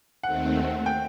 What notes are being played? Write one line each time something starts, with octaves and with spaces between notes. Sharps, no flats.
D#2 D#3 A3 C4 F#5
G5